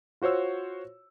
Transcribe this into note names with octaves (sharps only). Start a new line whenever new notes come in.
F4 F#4 C5 C#5 E6